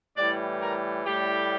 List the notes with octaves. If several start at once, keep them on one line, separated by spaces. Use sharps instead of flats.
A2 E3 G3 D5
A#4
A2 G3 G4